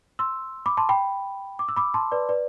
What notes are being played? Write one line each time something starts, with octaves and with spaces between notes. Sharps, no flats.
C6 E6
B5 D6
A5 C6
G5 B5
D6
E6
B5 D6
A5 C6
B4 D5
B4 D5